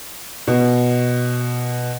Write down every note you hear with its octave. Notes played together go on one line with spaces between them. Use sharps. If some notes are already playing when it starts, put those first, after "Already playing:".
B2